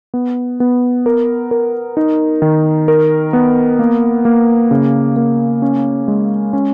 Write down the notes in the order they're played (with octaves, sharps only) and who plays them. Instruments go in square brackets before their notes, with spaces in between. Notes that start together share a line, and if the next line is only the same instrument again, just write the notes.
[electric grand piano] B3
B3
A#4
A#4
D#4
D#3
A#4
B3
A#3
A#3
C#3
A#3
C#4
G#3
C#4